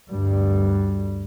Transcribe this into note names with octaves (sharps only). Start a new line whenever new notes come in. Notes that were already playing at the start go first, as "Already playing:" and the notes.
D2 G2 G3